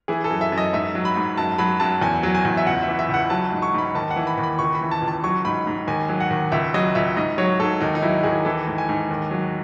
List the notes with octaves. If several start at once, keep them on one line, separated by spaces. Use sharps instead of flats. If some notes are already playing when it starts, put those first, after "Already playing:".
E3 G#4
A4
F#2
E5
F#2
D#5
G#2 E5
F#3
B5
G#2
F#2 A5
F#3 B5
F#2 A5
E2 G#5
F#3
G#5
E2
E5
C#2 F#5
E5
E3
E5
C#2
F#5
F#3 A5
G#2
C#6
G#2 B5
D#2 A5
F#5
E3
B5
D#2
B5
C#2 C#6
B5
E3
A5
C#2
A5
F#3 C#6
G#2 B5
G#2
D#2 G#5
F#3
F#5
D#2
C#2 E5
F#3 D#5
C#2 E5
G#2 D#5
F#3 C#5
G#2 A4
D#2 D#4
D#4
F#3 E4
D#2 G#4
E3 A4
G#2
G#5
G#2
D#2
F#3